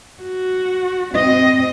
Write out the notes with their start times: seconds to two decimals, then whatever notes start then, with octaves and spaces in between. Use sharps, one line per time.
0.23 F#4
1.14 C4 D#5